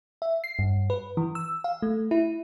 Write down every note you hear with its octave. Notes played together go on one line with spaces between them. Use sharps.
E5
C7
G2
B4
E3
E6
F5
A3
E4